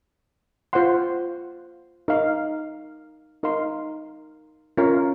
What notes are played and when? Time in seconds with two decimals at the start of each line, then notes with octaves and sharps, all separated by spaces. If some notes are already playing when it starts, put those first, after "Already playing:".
0.73 F4 C5 F#5 C6
2.08 D#4 A#4 F5
3.43 D#4 A#4 F5 C6
4.77 C#4 F4 A#4 F5